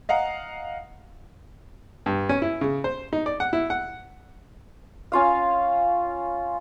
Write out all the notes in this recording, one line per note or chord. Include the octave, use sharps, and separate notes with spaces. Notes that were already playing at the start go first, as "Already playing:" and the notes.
D#5 F5 F#5 A#5
G2
C#4
E4
C#3
C5
D#4
D5
F#5
E4
F#5
C#4 F4 F5